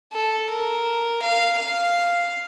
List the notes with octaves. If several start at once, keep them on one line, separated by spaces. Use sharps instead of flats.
A4
A#4
F5
F5